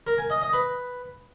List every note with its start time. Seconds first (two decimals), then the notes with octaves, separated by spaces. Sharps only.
0.07 A#4
0.18 G#5
0.30 D#5
0.42 D#5
0.53 B4